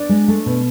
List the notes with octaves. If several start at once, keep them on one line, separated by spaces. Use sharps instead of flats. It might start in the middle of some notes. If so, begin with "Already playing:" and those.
Already playing: D4 D5
G#3
A3
B2